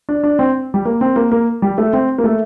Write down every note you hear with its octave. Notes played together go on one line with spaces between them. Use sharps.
D4
D4
C4
G3
A#3
C4
A#3
A#3
G3
A3
C4
A#3
A3